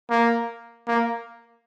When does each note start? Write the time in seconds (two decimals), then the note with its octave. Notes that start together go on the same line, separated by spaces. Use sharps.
0.10 A#3
0.87 A#3